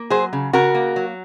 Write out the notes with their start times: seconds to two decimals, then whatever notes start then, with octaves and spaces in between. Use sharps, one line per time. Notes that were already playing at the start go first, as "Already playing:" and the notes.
Already playing: A#3
0.10 F#3 G#4 C5
0.33 C#3
0.53 C#3 F#4 A#4
0.75 A#3
0.96 F#3